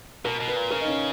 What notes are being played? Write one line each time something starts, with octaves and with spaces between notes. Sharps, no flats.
B2 A#4
B2
B4
A#2
C#3 A#4
D#4
C#4